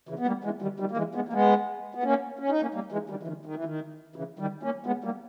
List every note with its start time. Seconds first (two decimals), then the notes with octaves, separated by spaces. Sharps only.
0.09 C#3 E3
0.19 B3
0.27 G3 A#3
0.44 E3 G#3
0.62 D#3 G3
0.80 D#3 G3
0.91 A#3
0.97 E3 G#3
1.15 G#3 B3
1.29 A#3
1.33 G#3 B3
1.95 B3
2.03 A#3 C#4
2.39 C#4
2.50 D#4
2.62 A#3 C#4
2.74 G3 A#3
2.92 E3 G#3
3.10 D#3 G3
3.23 E3
3.27 D#3
3.46 D#3
3.55 E3
3.64 D#3
4.16 C#3 E3
4.39 D#3 G3
4.63 A#3 C#4
4.86 G#3 B3
5.04 G3 A#3